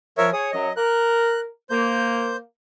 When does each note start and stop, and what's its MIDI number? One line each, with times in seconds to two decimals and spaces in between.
0.18 0.32 53
0.18 0.30 70
0.18 0.30 73
0.18 0.30 76
0.33 0.51 68
0.33 0.52 73
0.33 0.51 87
0.52 0.69 42
0.52 0.69 54
0.52 0.72 75
0.76 1.45 70
0.76 1.41 90
1.70 2.37 58
1.70 2.36 72
1.70 2.36 91